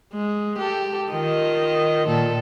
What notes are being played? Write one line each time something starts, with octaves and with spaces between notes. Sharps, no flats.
G#3
G4 A4
D#3 F4 D#5
A#2 D#3 A4